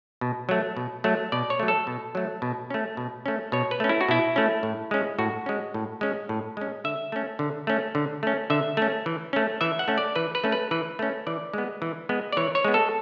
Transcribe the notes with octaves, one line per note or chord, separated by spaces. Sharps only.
B2
F#3 A3
B2
F#3 A3
B2 D5
C#5
F#3 A3
A4
B2
F#3 A3
B2
A3 C#4
B2
A3 C#4
B2 C#5
B4
A3 C#4
E4
F#4
B2 E4
A3 C#4
A2
G#3 C#4
A2 F#4
G#3 C#4
A2
G#3 C#4
A2
G#3 C#4
D3 E5
A3 C#4
D3
A3 C#4
D3
A3 C#4
D3 E5
A3 C#4
E3
A3 C#4
E3 E5
F#5
A3 C#4
D5
E3 B4
B4
A3 C#4
B4
E3 B4
A3 C#4
E3 D5
G#3 B3
E3
G#3 B3
D5
E3 C#5
C#5
G#3 B3
A4